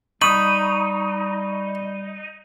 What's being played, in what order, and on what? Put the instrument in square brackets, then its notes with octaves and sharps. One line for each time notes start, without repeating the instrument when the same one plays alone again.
[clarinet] G3 [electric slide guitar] D#4 [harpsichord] B5 [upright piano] C#6 D#6